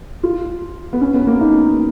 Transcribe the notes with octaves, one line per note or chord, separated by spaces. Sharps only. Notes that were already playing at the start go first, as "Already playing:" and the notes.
F4
B3
C#4
B3
A#3
D#4